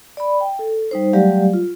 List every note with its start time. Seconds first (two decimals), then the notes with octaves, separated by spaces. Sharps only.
0.17 D5 B5
0.41 G5
0.59 A4
0.91 G3 D#4 C5
1.13 F#3 G3 A3 G4 D5 F5
1.54 F4